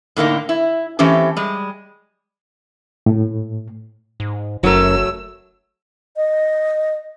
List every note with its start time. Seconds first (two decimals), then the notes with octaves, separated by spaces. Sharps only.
0.16 A2 D3 A#3 D#4
0.49 E4
0.99 E3 A3 C4 C#4 G4
1.37 G3 G#3
3.06 A2
4.20 G#2
4.63 F#1 F#2 F#3 A3 A#4 E6
6.17 D#5